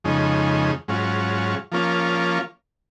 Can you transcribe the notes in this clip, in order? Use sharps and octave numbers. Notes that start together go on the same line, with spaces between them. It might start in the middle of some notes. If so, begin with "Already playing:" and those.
F2 C#3 G#3 D#4
G#2 F#3 C#4 F4
F3 A#3 C#4 F4